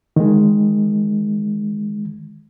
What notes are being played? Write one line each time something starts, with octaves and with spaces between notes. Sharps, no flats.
D#3 G#3